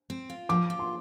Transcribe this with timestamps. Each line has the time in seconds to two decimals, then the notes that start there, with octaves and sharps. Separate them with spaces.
0.10 C4
0.30 F4
0.49 F3 D6
0.70 F4
0.79 C6